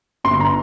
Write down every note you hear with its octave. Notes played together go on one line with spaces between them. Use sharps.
G1 C6
A#5